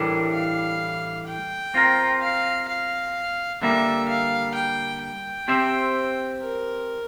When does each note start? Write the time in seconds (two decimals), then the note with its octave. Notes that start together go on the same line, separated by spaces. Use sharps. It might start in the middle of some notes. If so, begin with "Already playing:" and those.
Already playing: A2 E3 G3 D4 A#4
0.34 F5
1.27 G5
1.74 C4 F4 A#4
2.21 F5
2.68 F5
3.62 D3 G3 A#3 E5
4.08 F5
4.55 G5
5.02 G5
5.48 C4 G4 C5 E5
6.42 A#4